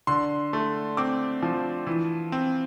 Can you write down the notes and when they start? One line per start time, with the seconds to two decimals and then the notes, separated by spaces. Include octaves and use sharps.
0.07 D3 C6
0.53 A3
0.97 C4 D6
1.42 F3
1.87 E3
2.32 C4